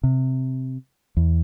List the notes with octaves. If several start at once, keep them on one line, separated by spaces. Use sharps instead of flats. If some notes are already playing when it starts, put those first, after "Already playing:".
C3
E2